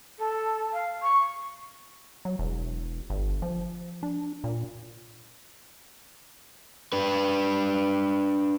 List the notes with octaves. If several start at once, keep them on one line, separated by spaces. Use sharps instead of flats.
A4
F5
C#6
F#3
E1
G1
F3
D4
A#2
D4 B4